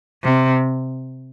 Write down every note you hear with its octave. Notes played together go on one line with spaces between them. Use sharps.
C3